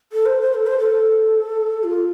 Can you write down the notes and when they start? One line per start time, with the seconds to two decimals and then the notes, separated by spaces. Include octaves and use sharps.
0.13 A4
0.26 C5
0.41 C5
0.54 A4
0.67 C5
0.79 A4
1.84 F4